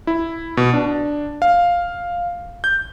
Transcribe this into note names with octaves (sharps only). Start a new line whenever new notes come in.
E4
B2
D4
F5
G6